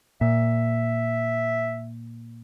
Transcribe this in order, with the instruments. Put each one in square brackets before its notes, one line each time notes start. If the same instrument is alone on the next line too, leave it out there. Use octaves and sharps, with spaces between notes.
[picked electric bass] A#2 [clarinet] E5